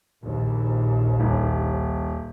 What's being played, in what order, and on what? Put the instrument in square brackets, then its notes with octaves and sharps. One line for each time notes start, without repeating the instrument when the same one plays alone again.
[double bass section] A#1 D#2
[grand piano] D#1